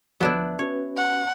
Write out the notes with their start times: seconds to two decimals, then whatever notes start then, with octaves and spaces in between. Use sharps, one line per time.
0.21 D2 B2 D3 F3 F#3 B3 D4 E4
0.59 C#4 F#4 B4 C#5
0.97 F#5